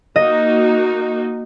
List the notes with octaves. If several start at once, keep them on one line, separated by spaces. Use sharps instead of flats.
A#3 D#4 F#4 D#5